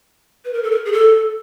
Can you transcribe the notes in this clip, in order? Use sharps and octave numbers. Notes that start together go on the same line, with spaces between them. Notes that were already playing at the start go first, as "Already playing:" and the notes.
B4
A#4
A4
A#4
G#4
A4